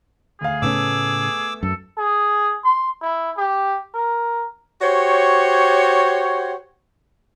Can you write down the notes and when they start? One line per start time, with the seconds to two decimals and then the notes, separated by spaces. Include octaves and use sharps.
0.41 D2 G#4 F5
0.62 A2 C#3 A3 B3 C#4 D6 E6
1.63 F#2 A4
1.98 G#4
2.64 C6
3.02 E4
3.37 G4
3.94 A#4
4.82 F#4 G4 C5 C#5